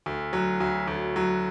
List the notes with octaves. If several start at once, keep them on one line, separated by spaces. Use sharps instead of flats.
D2
F#3
D2
D2
F#3